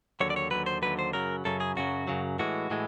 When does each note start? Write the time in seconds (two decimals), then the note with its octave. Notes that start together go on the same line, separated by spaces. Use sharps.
0.20 D#2 D3 F#3 C#5
0.30 D5
0.36 C#5
0.51 D#2 D3 F#3 B4
0.66 C5
0.82 D#2 D3 F#3 B4
0.99 C5
1.13 F#2 C#3 F#3 A#4
1.45 F#2 C#3 F#3 A4
1.60 G#4
1.77 F#2 C#3 F#3 F#4
2.07 F#2 C#3 F#3
2.39 A2 E3 G#3 F#4
2.70 A2 E3 G#3